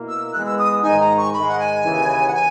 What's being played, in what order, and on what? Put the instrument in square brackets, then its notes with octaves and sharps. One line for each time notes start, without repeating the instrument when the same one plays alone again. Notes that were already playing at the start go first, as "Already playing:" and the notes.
Already playing: [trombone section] B2 A#3 E4 A#4
[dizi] E6
E6
[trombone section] E3 G#3 B3 [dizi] F#6
[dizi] E6
D#6
[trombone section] G#2 D#3 G#3 D#4 [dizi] G#5
[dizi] A#5
C#6
[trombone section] G#2 D#3 G#3 [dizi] B5
[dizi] F#5
G#5
[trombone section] D#2 C#3 E3
[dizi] F#5
G#5